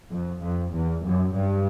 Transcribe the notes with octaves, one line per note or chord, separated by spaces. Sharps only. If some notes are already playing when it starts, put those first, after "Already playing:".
F2
F2
E2
F#2
G2